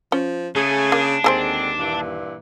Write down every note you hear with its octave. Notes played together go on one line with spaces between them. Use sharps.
F3 C#4
C#3 A3 G#4
A#3 D4
D#2 D3 G#3 C4 G#4 A4 C5
G2 A#2 E3